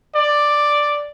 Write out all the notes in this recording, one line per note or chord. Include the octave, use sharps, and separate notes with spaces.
D5